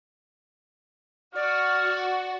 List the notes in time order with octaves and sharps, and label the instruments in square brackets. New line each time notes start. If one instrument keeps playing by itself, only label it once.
[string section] F#4 [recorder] D5 [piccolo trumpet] F6